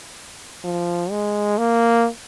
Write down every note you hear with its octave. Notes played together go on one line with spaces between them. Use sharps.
F3
G#3
A#3